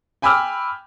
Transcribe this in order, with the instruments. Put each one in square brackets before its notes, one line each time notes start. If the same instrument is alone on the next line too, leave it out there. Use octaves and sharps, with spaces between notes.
[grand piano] G5 G#5 B5 D6 E6 F6